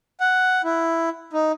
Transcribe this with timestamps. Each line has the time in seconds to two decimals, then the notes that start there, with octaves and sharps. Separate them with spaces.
0.20 F#5
0.64 E4
1.33 D#4